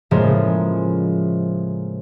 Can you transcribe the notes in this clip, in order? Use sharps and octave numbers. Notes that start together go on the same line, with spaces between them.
A2 C#3 F3 G#3 A#3